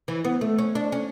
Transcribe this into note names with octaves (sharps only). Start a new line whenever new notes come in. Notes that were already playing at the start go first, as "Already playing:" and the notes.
E3
B3
A3
C#4
D4
C#4